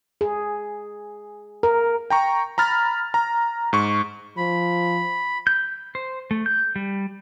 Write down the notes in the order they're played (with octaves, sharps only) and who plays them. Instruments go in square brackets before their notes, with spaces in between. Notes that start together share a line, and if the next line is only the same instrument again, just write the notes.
[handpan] G#4
A#4
[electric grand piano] G5 A#5 C#6
A#5 B5 F6 A6
A#5
G#2 C#6
[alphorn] F3 [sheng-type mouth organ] B5
[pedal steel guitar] G6
C5
A3
G6
G3